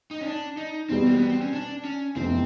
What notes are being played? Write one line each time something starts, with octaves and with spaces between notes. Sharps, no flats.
D#4
C#4
D4
D#4
E2 B2 G3 C4
A#3
B3
C4
C#4
D4
C#4
F1 E2 C3 C4